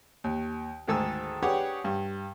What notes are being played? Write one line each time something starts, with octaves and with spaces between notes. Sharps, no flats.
D#2
D2 G#2 D#3 A4 G#5 E6
D4 G4 G#4 B4 C#5 F#5
G2